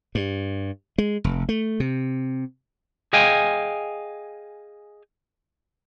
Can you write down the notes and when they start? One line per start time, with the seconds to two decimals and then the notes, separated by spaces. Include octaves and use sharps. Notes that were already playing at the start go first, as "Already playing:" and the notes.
0.15 G2
0.98 G#3
1.24 F1
1.49 A3
1.80 C3
3.13 G#4 D#5 F5 G5 G#5